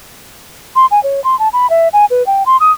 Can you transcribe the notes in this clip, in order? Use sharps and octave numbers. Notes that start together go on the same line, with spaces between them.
C6
G#5
C#5
C6
A5
B5
E5
G#5
B4
G5
C6
D#6